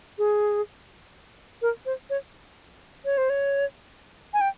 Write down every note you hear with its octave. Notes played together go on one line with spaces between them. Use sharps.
G#4
A#4
C5
C#5
C#5
C5
C#5
G#5
G5